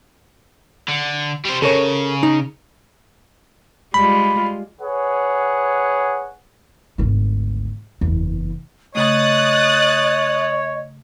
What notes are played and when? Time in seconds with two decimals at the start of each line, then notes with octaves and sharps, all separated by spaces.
0.88 D3
1.45 G3 C5
1.62 C#3 A4 A#4 C#5
2.23 D#4
3.94 G3 G#3 F4 B5
4.81 G#4 B4 C#5 F#5
6.98 G#1 D2
8.01 F#1 E2
8.95 C#3 A3 C#5 D#5 D#6 F#6 A6